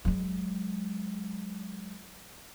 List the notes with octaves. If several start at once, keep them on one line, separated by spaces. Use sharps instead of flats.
F#3 G#3